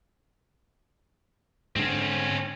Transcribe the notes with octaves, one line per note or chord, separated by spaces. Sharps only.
G#2 D3 C4 C#4